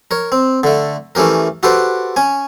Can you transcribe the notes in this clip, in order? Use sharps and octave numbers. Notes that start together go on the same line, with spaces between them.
A#4 C#5
C4
D3 A3
E3 A3 C#4 G4 A#4
F#4 G4 A4 B4 C5 G5
C#4 G#5